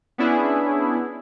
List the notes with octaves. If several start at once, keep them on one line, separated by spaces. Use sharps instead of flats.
B3 C#4 D4 E4 G#4